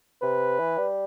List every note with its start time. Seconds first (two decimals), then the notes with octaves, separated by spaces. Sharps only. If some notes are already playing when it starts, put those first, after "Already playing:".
0.22 C3 B4
0.60 E3
0.78 G3